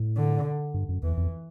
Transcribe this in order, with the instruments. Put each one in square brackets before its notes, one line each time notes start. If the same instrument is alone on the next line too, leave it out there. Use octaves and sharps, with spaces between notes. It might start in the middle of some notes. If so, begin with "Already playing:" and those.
Already playing: [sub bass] A2
[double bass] D3
[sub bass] G2
F#2
[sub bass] E2 [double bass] E3
[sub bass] F2